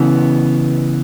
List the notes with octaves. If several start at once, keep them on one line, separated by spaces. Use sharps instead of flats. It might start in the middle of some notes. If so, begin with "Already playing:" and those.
Already playing: C#3 E3 B3